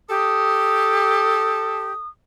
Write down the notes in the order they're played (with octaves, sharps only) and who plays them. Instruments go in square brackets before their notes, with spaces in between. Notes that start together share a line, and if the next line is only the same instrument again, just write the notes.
[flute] G4 [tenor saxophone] A4 [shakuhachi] D#6